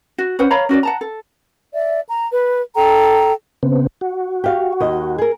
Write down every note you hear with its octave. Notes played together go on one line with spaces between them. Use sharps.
F#4
C#4 B4 C5 F#5
C#5 F5 A#5 B5
C#4 F#4 C5 D5
F#5 A5 A#5
A4
D5 E5
A#5
B4
A4 G5 A#5
C#3 B3 C4
F#4
G4 F5
D#2 D#5
G#4 A#4